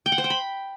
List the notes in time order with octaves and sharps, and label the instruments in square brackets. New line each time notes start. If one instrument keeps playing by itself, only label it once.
[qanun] G5
F#5
C5
G5
B5